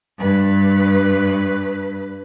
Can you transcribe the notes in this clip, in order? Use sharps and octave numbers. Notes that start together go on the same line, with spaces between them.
G2 B4